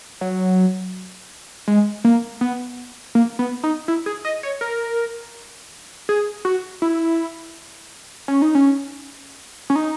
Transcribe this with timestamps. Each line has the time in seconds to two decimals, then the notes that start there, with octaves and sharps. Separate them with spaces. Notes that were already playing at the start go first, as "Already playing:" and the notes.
0.21 F#3
1.68 G#3
2.04 A#3
2.41 B3
3.15 A#3
3.39 B3
3.63 D#4
3.88 E4
4.06 G#4
4.25 D#5
4.43 C#5
4.61 A#4
6.09 G#4
6.45 F#4
6.82 E4
8.28 C#4
8.42 D#4
8.55 C#4
9.70 C#4
9.76 D#4